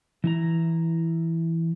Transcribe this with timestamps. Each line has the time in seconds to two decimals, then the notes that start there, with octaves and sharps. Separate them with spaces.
0.24 E3 E4 A#5